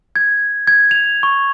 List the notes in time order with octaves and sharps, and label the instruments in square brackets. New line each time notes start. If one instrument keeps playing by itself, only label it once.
[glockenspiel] G#6
G#6
F7
C#6